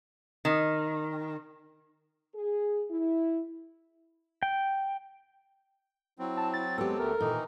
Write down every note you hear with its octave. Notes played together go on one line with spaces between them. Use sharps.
D#3
G#4
E4
G5
F#3 C4 E4
A5
A6
G#3 B3 G4 A4
D2 A3 A#4
A#2 D#3 E3 D#4